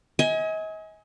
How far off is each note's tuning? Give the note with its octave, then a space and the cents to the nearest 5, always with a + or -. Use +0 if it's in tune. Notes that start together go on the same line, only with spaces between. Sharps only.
D#5 +40 G#5 +0